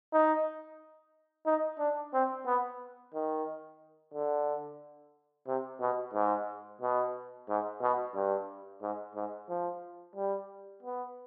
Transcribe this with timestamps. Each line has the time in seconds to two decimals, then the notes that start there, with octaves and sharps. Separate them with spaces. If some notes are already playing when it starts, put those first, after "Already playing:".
0.13 D#4
1.46 D#4
1.79 D4
2.14 C4
2.46 B3
3.14 D#3
4.14 D3
5.47 C3
5.80 B2
6.14 G#2
6.82 B2
7.48 G#2
7.82 B2
8.15 G2
8.82 G#2
9.15 G#2
9.49 F3
10.16 G3
10.83 B3